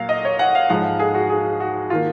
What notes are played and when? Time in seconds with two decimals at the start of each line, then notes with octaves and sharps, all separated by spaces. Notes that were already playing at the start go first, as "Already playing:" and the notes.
Already playing: A#2 F#3 F5
0.09 D#5
0.25 C#5
0.39 F#5
0.55 F5
0.70 G#2 F3 G#3 F#5
0.84 F5
0.99 G#4
1.14 F#4
1.30 G#4
1.60 F#4
1.90 D#3 A#3 F4